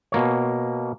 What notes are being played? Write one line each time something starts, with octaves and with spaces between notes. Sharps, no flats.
B2 A#3 C#5